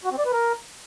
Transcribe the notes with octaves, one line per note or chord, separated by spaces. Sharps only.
F#4
C4
D5
B4
A#4